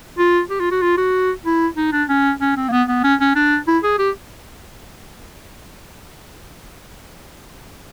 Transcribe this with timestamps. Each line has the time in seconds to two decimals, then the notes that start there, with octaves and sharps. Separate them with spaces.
0.18 F4
0.50 G4
0.60 F4
0.71 F#4
0.82 F4
0.98 F#4
1.45 E4
1.77 D#4
1.92 D4
2.09 C#4
2.41 C#4
2.57 C4
2.68 A#3
2.72 B3
2.88 B3
3.04 C#4
3.21 C#4
3.35 D4
3.67 E4
3.84 G#4
3.99 G4